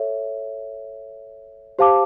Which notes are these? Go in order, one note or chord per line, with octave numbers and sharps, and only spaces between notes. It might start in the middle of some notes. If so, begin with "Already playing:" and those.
Already playing: A4 C#5 E5
G4 C5 F5 A5 D6